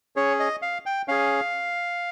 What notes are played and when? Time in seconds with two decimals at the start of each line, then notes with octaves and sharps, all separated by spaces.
0.16 C#4 G#4 C#5
0.40 D#5
0.62 F5
0.86 G5
1.08 C#4 G#4 F5